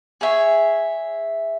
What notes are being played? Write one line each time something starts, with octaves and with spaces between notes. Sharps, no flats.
G#4 C#5 E5